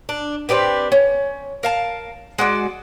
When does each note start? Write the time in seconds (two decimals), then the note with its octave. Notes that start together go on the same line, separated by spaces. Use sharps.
0.09 D4
0.49 C4 D4 G4 B4
0.92 C#4
1.63 A#4 F5 A5
2.38 G#3 F#4 D5